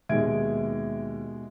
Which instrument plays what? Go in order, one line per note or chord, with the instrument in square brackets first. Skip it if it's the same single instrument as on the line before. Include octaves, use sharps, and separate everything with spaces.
[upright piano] D#2 D7 [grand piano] B2 G#3 G#6 [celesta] E5